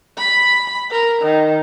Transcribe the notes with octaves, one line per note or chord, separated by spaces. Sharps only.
B5
A#4
D#3